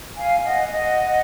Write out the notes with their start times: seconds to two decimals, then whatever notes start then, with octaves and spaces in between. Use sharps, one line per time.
0.17 F5 G#5
0.45 D#5 F#5
0.71 D#5 F#5